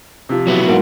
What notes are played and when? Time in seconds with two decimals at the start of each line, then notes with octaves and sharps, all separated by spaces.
0.29 C3 F3
0.47 F#3 B3 E4
0.67 G#2 A#3 F#5